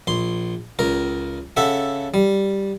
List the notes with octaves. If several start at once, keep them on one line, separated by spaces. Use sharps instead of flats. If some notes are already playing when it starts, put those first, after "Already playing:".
A#1 C6
C#2 A#4
C#3 A4 E5 F#5
G3